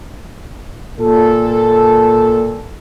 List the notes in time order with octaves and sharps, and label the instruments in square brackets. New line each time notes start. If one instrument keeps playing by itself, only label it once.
[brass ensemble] A#2 A4